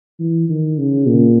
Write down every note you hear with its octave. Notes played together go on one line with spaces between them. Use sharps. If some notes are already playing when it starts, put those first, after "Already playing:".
E3
D#3
C#3
A#2